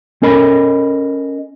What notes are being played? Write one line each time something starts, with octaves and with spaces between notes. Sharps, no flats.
C#4 A4 A#4 D#5 B5